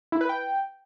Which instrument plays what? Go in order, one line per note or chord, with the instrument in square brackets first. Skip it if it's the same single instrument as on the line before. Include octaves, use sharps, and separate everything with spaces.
[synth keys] E4
B4
G5